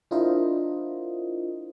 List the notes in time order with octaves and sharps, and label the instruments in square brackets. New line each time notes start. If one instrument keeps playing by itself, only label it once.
[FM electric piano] D4 E4 F4 A#4 C5 D#5